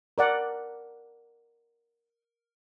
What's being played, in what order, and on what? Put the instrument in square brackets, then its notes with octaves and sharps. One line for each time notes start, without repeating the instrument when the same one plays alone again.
[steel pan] A#4 D5 F#5